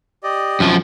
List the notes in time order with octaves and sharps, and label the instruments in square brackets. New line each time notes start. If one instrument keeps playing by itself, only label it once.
[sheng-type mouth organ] G4 D5 D#5
[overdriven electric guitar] F#2 F3